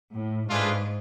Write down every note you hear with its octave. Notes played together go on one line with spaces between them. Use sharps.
A2
G#2 A3 D4 F4 G#4 B4